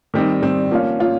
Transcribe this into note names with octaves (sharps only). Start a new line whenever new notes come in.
D#3 G3 C4 D#4
D#3 G3 C4 D#4
F3 A#3 C#4 F4
F3 A#3 C#4 F4